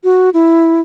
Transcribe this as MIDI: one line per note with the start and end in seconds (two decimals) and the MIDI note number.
0.04 0.30 66
0.34 0.81 64